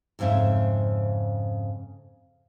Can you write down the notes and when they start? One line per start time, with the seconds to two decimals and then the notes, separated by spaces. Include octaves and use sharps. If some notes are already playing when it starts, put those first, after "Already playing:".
0.19 F2 G#2 C#3 C4 E5